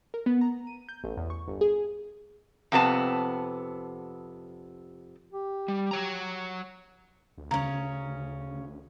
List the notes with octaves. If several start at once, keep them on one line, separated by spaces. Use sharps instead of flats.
A#4
B3
A#5
D#7
G6
A1
E2
C#6
G1
G#4
F2 C3 B3 A5
G4
G3
F#3 C#5 A#5
D2
C#3 C#4 A#5